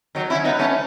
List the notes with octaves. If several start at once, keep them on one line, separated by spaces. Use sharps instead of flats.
D#3 F#3
C#4 E4
B3 D#4
A3 C#4